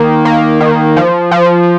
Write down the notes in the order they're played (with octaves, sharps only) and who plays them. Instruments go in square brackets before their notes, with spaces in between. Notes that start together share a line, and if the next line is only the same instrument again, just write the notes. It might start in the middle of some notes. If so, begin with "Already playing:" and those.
Already playing: [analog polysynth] D#3 A#3
A#3
D#3
F3
F3